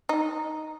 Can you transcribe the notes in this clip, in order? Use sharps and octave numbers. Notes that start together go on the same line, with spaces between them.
D#4